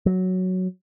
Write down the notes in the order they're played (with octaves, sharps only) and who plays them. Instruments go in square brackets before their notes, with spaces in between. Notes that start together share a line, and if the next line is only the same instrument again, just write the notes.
[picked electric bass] F#3